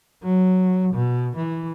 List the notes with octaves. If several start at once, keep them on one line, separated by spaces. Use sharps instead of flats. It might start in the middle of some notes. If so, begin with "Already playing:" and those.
F#3
B2
E3